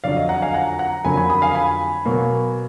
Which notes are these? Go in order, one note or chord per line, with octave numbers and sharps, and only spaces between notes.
F2 D3 F#3 D5 F5
D#5
F#5 A#5
F5 G#5
F#5 A#5
F#5 A#5
F2 D3 F#3 A#3 G#5 B5
G#5 B5
B5 D#6
F5 G#5
G#5 B5
B2 F#3 A#3